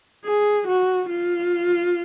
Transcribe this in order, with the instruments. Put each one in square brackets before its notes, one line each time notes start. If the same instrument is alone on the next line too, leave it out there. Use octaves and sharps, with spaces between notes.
[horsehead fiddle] G#4
F#4
F4